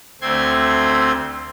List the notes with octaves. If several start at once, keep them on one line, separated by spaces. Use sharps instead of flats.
D2 A3 C4 C6 G#6